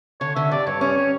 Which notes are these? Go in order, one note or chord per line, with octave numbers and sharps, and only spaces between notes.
D3 C#5
D3 E5
G2 D5
G2 C#5
C#4 C#5
C#5